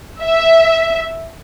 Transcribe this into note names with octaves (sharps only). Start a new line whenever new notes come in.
E5